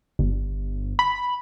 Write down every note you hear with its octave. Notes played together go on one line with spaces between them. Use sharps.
G1
B5